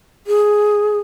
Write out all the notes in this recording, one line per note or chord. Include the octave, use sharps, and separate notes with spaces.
G#4